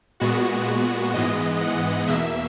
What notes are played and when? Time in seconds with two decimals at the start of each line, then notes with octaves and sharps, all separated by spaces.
0.20 A#2 G#3 B3 F#4
1.14 G#2 E3 G#3 B3 D#5
1.61 F#5
2.08 E2 B2 A#3 E5